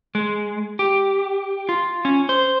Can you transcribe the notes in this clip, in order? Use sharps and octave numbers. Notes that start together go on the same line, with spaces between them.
G#3
G4
F4
C#4
C5